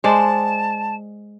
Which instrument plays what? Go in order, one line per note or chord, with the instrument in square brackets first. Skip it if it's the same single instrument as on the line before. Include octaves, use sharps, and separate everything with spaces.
[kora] G#3 C5 D5 [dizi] A5